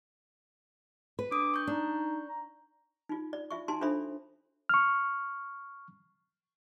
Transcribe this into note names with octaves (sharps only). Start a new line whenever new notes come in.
B4
D4 D6 D#6
C#6 G6
D4 D#4
A#5
D#4 F4
D5
F4 E5 C#6
D#4 F#4 G#5 A5 C6
D4 F4 A4 C5 E5 B5
C#6 F6